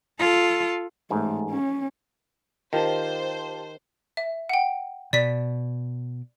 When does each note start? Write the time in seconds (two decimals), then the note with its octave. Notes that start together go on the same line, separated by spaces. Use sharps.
0.19 F4 A4
1.10 A1 G#2 A3
1.50 C#4
2.73 D#3 F4 G4 C5 A5
4.17 E5
4.49 F#5 G5
5.13 B2 D5 B6